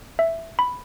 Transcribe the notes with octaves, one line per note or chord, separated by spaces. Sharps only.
E5
B5